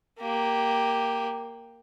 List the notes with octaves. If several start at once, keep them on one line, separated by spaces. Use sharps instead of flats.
A#3 G4